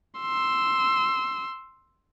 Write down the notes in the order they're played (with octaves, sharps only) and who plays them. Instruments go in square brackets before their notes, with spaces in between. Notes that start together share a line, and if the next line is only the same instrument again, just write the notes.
[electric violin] C6 E6